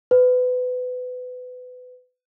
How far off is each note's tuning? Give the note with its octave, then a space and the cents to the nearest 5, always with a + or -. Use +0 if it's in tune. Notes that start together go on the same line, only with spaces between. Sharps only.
B4 +25